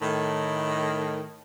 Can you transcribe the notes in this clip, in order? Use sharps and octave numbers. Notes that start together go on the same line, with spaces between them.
A2 D#3